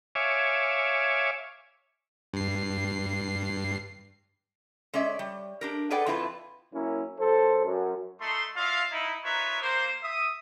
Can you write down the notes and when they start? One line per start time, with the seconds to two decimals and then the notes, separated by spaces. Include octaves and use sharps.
0.15 C#5 E5 F5 G#5 D6
2.34 G2 C7
4.94 G#3 C#4 D5 E5
5.19 G3
5.61 D4 G4 A#4
5.90 G#4 A4 B4 D5 F#5 G5
6.06 F2 C4 E4 F4 B4 A5
6.73 F#2 A#3 C#4 E4
7.20 F#2 A4 C5
7.65 F#2
8.21 A3 D#4 C6
8.56 F4 F#4 D5 E5 F5
8.92 D#4 E4
9.24 D#4 F4 A#4 B4 C#5 E5
9.62 A#3 C5
10.03 E5 D#6